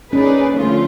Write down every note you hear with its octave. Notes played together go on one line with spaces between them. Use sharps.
A#3 C#4 D#4 G#4 B4 D5
D3 F3 A3 C#4 F4